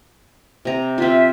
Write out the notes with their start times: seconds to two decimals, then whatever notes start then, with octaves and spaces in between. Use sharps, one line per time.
0.65 C3 A#5
0.98 C4 F4 E5